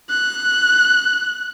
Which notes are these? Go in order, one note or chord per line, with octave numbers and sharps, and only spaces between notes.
F#6